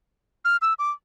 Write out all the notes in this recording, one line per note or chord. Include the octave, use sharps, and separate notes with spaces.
F6
E6
D6